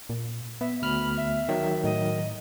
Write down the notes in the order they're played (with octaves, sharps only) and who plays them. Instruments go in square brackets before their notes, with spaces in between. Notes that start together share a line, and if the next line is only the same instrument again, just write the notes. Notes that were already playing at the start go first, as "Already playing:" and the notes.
[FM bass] A#2
[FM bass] B3 [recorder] E5
[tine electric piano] D2 F6 [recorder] B5
[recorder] E5
[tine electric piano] D#3 F#3
[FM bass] A2 [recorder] D#5